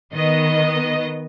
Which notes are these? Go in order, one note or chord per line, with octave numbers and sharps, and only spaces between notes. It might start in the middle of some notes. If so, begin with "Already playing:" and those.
D#3 B3 D#5